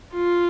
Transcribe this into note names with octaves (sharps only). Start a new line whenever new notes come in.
F4